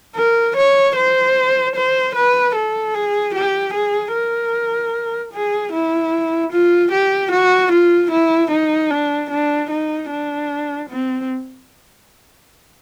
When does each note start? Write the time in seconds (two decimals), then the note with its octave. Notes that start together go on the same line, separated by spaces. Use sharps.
0.16 A#4
0.56 C#5
0.96 C5
1.76 C5
2.15 B4
2.55 A4
2.94 G#4
3.34 G4
3.74 G#4
4.14 A#4
5.33 G#4
5.73 E4
6.52 F4
6.92 G4
7.32 F#4
7.72 F4
8.11 E4
8.51 D#4
8.90 D4
9.30 D4
9.71 D#4
10.10 D4
10.90 C4